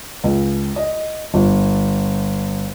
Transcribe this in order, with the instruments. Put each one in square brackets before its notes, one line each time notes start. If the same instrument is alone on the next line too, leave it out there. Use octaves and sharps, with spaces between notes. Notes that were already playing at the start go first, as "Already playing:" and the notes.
[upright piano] C#2
D#5
G1